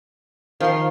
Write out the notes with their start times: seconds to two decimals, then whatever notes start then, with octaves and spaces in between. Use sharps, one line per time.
0.60 D#3 F3 C6